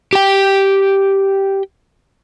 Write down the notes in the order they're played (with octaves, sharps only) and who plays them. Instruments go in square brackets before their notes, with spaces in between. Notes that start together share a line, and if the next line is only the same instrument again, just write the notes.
[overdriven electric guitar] G4 G5